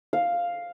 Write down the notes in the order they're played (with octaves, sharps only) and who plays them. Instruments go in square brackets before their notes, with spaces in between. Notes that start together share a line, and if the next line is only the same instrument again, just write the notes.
[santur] F5